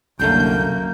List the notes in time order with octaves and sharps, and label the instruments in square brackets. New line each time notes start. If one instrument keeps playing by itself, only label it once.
[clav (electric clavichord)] C2 D3 A3 [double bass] F#2 A#3 [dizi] G6